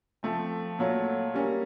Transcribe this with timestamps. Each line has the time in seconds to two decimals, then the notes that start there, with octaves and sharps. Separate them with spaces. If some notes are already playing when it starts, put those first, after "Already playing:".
0.23 F3 A3 C4
0.79 A#2 F#3 A3
1.34 G3 A#3 C#4